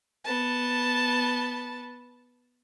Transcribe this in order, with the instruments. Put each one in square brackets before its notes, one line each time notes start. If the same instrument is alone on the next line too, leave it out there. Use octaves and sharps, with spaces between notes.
[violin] B3 A5